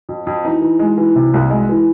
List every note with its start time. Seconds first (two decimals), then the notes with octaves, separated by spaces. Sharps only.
0.09 F2
0.27 F2
0.45 E3 D#4
0.62 E3
0.79 G#3
0.98 E3
1.16 C3
1.34 C2
1.50 G#3
1.69 E3